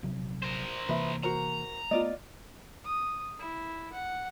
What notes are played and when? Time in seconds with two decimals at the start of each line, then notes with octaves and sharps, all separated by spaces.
0.03 A#1 C3 F#3
0.42 A#4 C5
0.89 C3 E3 A#3 B4 E5
1.23 F#4 A#4 C5 A#5
1.91 A3 B3 F4 D5 D#5
2.84 D#6
3.39 E4
3.93 F#5